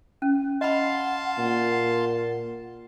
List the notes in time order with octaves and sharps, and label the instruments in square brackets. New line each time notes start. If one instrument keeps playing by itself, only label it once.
[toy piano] C#4
[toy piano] D#5 B5 [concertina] F5 A5 C6 [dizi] F#5
[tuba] A#2